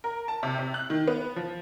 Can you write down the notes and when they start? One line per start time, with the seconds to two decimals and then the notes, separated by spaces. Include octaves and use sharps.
0.04 A#4
0.28 A5
0.43 C3
0.59 C3
0.74 F#6
0.90 D#3
1.08 B3
1.36 F3